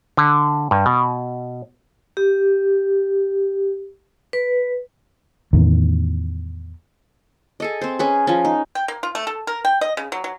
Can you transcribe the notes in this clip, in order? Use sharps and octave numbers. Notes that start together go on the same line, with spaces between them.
D3
G2
B2
G4
B4
E2 A2 D#3
G#4 A4 D#5
C4 C5
C#4 G#4 B4
F3 C#4
D#4
G5
A#3
F4
A3
A4
A#4
G5
D#5
C#3
F#3
F#3